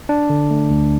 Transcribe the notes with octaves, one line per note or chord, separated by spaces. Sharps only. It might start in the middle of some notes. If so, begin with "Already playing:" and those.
D4
D3
A3
D2